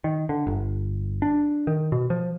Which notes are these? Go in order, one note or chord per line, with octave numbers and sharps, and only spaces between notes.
D#3
D3
G1
D4
D#3
B2
F3